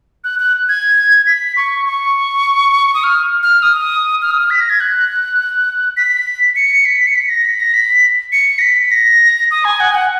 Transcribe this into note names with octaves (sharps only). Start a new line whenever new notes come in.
F#6
F#6
G#6
B6
C#6
C#6
D#6
F6
F6
D#6
F6
D#6
F6
B6
A#6
G#6
F#6
B6
C#7
B6
C#7
B6
A#6
B6
A#6
B6
C#7
A#6
B6
B6
A#6
D#6
G#5
F#5
G#5
F#5